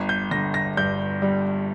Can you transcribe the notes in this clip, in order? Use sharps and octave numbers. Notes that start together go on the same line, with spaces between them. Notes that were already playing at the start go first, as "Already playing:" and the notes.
Already playing: G1
G6
D3 A#6
A#6
G2 G6
G3